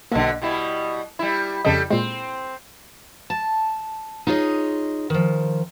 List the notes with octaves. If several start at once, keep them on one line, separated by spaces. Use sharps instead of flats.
B1 B2 D3 A#3
B2 G3 E4
G3 E4
F2 C#3 G3 A4 D#5
A#2 G#3 C4
A5
D#4 F4 G#4 C#5 D#5
D#3 F3